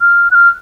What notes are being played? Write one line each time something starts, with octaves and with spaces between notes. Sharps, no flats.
F6
F#6
F6